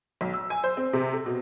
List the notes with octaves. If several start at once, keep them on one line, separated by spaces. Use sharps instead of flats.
B1
E6
G#5
C5
C4
C3
A4
B2